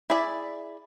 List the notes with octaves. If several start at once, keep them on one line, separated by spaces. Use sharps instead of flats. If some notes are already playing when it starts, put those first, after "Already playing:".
E4 G#4 D5 E5